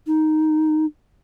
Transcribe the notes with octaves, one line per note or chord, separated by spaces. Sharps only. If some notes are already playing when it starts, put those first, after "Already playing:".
D#4